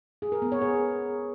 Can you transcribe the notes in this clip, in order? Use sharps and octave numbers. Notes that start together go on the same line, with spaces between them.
G#4
A#4
B3
C#5
G#4